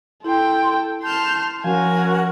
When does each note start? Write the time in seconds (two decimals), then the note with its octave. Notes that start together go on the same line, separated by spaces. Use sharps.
0.24 E4 A4 G5 C6
1.03 A5 C6 F6 G6
1.64 F3 C#4 F#4 A#4 G#5